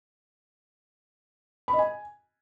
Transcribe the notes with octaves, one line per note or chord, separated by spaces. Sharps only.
B5
D#5
G#5